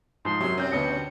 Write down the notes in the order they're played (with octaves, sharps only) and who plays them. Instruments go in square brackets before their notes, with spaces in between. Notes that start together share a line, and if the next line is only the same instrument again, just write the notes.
[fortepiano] G#2 F3 [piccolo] C6
[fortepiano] F#2 C3 [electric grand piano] F#3 [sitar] C#5
[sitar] F3 F#3 C4 [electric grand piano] C#4 G4 G6
[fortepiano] D2 B2 B4 [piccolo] C#7